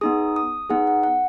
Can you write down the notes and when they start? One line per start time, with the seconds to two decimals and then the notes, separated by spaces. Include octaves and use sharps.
0.01 B3 D#4 G#4 D#6
0.36 D#6
0.70 B3 D#4 G#4 F#5
0.87 F#5
1.03 F#5